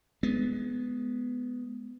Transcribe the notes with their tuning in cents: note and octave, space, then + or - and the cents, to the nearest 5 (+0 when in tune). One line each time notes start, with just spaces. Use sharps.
G#3 +30 B3 +10